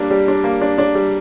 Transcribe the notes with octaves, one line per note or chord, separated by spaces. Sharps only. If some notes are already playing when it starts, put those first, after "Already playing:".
Already playing: G3 A#3 D4
G3
D4
A#3
D4
D4
G3